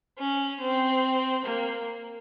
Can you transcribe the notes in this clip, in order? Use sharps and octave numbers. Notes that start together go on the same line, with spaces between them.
C#4
C4
A#3